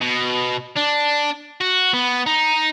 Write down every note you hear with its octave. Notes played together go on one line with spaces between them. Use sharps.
B2
D4
F#4
B3
D#4